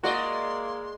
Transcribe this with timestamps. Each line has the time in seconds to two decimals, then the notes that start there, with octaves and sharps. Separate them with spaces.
0.04 G#3 A#3 F#4 D5 D#5 C6